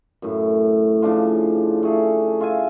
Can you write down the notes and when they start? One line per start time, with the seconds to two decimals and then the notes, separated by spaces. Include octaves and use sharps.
0.22 F#2 A2
1.02 C#3 F3 D4 F4
1.83 A3 G#4 A4
2.41 F4 E5 G#5